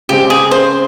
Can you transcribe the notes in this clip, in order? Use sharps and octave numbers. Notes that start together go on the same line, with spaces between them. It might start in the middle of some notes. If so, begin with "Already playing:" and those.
C#3 G#3 C4 G4
G#4
C5